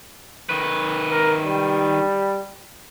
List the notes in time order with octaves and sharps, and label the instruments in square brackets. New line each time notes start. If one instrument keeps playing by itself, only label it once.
[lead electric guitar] D#3 B4
[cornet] A#4
G3